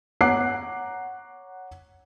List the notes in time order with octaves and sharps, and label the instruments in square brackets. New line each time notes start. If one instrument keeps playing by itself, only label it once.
[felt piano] C#5 F#5 A#5 D6 F#6 C7